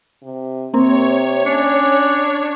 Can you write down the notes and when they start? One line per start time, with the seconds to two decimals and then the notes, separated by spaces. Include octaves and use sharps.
0.23 C3
0.74 C3 A#3 C4 C#5
1.46 C#4 D4 C#7